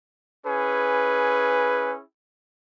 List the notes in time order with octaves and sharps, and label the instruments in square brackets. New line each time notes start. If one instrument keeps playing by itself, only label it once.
[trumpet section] C#4 E4 G#4 [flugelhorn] B4